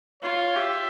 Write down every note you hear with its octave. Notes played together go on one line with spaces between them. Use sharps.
F4 C#5
G4 E5